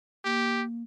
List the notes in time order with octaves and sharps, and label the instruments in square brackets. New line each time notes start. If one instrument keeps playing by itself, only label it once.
[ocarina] A#3 [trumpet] G4